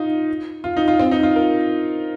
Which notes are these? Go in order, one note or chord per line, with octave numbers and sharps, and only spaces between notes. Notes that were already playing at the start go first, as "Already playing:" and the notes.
Already playing: D#4 F4
F4
D#4
F4
C4
D#4
F4
A#4